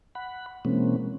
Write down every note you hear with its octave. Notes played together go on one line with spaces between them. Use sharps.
F#5 B5
B2 E3 G#3 A#3 C4 C#4